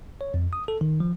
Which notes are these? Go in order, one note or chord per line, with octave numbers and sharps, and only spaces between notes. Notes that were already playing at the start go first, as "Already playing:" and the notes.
C#5
F2
D#6
A4
D#3
F3